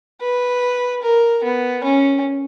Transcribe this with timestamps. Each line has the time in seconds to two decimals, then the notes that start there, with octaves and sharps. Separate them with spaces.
0.21 B4
1.02 A#4
1.44 B3
1.84 C#4